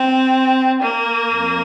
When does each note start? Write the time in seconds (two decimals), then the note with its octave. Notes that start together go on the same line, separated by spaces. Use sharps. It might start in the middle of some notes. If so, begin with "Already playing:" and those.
Already playing: C4
0.82 A#3
1.34 F2